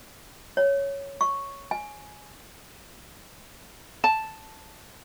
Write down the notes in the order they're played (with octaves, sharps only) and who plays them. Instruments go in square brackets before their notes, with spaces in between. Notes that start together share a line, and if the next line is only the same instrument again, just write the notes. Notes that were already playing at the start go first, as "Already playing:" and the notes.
[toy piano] C#5
C#6
G#5
[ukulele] A5